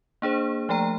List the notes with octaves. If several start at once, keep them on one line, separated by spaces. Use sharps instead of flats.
A#3 D4 G#4 C5
F3 A3 G5 A#5